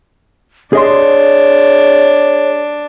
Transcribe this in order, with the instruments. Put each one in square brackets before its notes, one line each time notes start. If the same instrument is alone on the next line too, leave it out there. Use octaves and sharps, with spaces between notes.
[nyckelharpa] D4 [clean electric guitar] G#4 D#5 C6 [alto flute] C#5